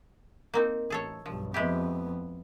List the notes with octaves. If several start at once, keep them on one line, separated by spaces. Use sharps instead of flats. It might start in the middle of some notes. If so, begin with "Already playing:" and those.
A#3 C4 D#4
A1 G#4 A4 C#5
B1 G2 F3
F2 G#3 B3 E4 G4